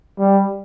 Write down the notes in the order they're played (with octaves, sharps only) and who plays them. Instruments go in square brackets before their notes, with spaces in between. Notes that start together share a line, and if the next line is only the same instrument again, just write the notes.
[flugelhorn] G3